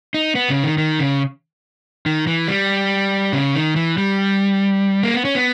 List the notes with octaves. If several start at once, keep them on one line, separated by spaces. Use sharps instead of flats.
D#4
B3
C#3
D#3
D#3
C#3
D#3
E3
G3
C#3
D#3
E3
G3
A#3
B3
C#4
B3